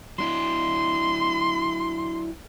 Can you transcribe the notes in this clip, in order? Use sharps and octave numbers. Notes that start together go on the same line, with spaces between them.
F#3 D4 E4 C6